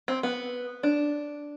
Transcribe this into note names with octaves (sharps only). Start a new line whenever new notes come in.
C4
B3
D4